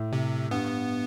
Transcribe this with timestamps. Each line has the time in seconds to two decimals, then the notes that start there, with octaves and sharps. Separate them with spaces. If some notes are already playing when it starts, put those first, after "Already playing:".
Already playing: A2
0.13 C3
0.51 G2 B3